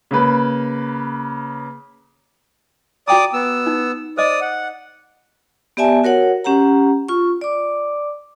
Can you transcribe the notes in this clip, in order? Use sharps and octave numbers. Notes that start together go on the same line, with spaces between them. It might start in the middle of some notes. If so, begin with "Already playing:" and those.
C#3 A#3 B4
F#4 D5 G5 A#5 D6 D#6
B3 E6
D#4
C5 D5 D#5 D#6
F#5
B3 G4 D5 E5 G#5 A5
F#4 A#4 C#5 F#5
C#4 G4 F#5 A#5
F4 C#6
D5 D6